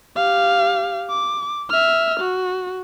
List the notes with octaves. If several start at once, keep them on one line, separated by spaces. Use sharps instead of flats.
G4 F5
D6
E5 F6
F#4